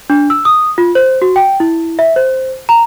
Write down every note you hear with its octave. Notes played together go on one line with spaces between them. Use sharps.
D4
E6
D#6
F4
C5
F#4
G5
E4
E5
C5
A#5